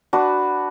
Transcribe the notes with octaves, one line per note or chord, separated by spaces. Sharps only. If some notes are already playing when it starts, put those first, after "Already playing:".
D4 F#4 B4